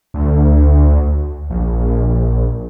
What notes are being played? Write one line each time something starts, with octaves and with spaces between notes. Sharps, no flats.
D2
A#1